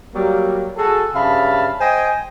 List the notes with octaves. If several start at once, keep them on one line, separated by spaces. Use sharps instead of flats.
F#3 G3 A#3
F#4 G#4 A4
G2 C#3 E5 F5 A5 B5
C5 D#5 G5 G#5